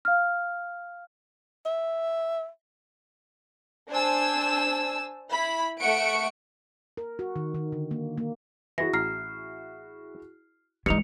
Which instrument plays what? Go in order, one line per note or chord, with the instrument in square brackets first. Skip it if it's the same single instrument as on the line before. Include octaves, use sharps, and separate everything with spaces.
[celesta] F5 F6
[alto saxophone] E5
[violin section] D4 C5 G#5 A5 E6
E4 B5
A3 E5 F#5 C#6 C#7 D7
[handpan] A#4
F#4
D#3
D#3
D3
A#3
A#3
[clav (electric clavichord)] E3 [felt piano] E4 F#4 G#4 [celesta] A#6
[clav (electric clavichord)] A1 A#5 [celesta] F6 C7
[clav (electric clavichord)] G2 D#4 [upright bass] E3 G#3 [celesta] C#7 F7